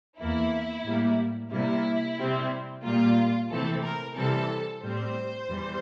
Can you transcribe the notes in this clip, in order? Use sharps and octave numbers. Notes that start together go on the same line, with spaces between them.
E2 E3 A#3 E4
A2 G3 A#3
C3 G3 A#3 E4
C3 G3 C4
A#2 G3 A#3 F4
C3 E3 A3 C4 A4
A#4
C3 E3 G3 C4 A4
A2 G3 C4 C5
E2 E3 G3